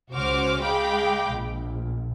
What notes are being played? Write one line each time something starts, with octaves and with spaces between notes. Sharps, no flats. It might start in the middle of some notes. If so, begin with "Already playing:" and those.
C#2 C#4 F#4 C5 D6 F6
G#3 F5 G5 B5 D6
A#1